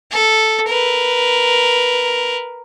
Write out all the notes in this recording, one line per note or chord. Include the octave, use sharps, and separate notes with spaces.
A4
A#4 B4